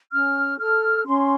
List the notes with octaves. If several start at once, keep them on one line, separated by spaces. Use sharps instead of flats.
C#4 F6
A4 F6
C#4 C6